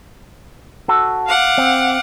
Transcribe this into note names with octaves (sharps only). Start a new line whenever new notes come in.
F#4 A4
F5 F#5 D6
C4